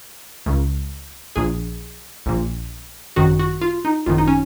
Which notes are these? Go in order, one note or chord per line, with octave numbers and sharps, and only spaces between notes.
C#2 C#3
A#1 A#2 G#4
A#1 A#2
G#1 F#2 D#3 F#4
F#4
F4
D#4
G#1 F#2 D#3 F4
D#4
C#4